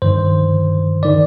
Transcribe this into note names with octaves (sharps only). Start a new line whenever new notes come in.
G2 D#3 C5
D#3 D5